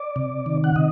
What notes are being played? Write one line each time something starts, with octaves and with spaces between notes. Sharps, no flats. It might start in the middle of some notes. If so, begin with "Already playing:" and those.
Already playing: D5
C3
D#3
F#5
C3 D#5